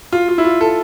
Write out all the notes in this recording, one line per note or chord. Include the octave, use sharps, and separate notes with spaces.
F4
F4
E4
F4
A4